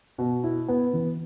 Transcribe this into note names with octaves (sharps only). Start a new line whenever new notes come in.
B2
E4
B3
E3